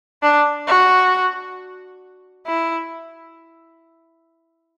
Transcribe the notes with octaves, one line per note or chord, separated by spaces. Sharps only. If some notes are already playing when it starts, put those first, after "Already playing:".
D4
F#4
E4